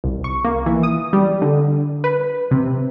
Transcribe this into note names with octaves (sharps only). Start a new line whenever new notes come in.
C2
C#6
A#3
E3
D#6
G3
D3
B4
C3